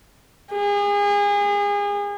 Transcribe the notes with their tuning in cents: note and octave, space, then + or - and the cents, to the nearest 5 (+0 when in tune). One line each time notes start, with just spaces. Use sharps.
G#4 -35